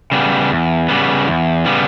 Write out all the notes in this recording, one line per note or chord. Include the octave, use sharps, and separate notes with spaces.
C#3 G3 B3
E2
C#3 G3 B3
E2
C#3 G3 B3